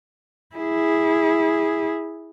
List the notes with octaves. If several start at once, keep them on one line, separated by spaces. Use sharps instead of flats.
E4 G#4